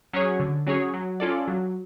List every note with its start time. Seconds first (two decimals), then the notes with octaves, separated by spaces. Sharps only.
0.13 F#3 C#4 G#4 C#5
0.40 D3
0.67 F#3 C#4 G#4 C#5
0.94 F#3
1.20 C#4 F4 A4 D5
1.48 F#3